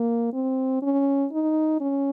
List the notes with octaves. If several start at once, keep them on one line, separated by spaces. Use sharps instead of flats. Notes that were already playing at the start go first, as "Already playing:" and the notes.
Already playing: A#3
C4
C#4
D#4
C#4